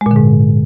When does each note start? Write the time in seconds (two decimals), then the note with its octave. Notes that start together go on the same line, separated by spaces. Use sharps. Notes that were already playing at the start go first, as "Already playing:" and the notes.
0.01 G#3
0.06 A#2
0.11 D3
0.16 G#2